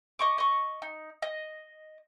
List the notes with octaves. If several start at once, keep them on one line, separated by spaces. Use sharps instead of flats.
D#5 C#6 D6
D#5 C#6
D#4
D#5